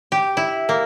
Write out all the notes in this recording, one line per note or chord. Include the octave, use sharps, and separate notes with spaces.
G4
E4
A#3